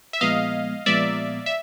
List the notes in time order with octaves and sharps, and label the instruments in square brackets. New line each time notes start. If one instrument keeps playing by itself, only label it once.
[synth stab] E5
[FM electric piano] A#2 F3 G#3 B3 [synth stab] D#5 F5
[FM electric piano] A#2 F3 G#3 B3 [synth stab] D5 E5
[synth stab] E5